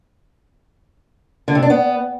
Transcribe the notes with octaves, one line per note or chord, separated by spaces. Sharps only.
D3
C3
D4
B3